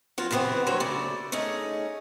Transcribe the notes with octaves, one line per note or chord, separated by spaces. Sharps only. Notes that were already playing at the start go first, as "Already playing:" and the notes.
F#3 F4
F#2 C#3 E3 B3 C4
D3 F#3 A#3 C5 C#5
C#3 A3 D5
A3 C#4 D#4 G#4